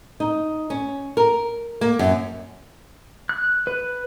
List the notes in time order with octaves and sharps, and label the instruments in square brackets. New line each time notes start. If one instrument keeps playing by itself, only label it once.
[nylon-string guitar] D#4
C#4
A#4
A#3
F#2
[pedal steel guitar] F#6
B4